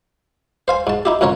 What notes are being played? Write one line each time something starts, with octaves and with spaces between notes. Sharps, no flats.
C5 F5 G#5
G#2 A5
D#4 E4 G4
F2 G#2 C#3 A#4 C#5